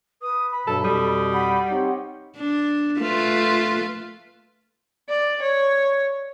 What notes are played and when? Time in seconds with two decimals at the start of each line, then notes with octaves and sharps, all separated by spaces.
0.22 B4 D#6
0.52 B5
0.67 G2 B2 F#3 A4
0.85 F2 B2 G3 A4 D#6
1.33 F#5 B5
1.71 C4 D#4 G4 C#5
2.38 D4
3.00 A3 F4 B4
5.09 D5
5.42 C#5